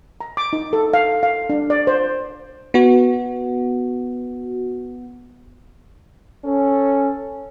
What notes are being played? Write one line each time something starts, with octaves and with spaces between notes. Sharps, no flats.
A#5
D6
D#4
A4
F5
F5
D4
D5
C5
B3 F#4
C#4 A4